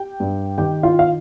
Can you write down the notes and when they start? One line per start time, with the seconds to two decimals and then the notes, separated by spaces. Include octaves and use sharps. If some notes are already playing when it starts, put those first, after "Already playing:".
Already playing: G4 G5
0.20 G2
0.58 D#3 G4 G5
0.83 F4 F5
0.99 F5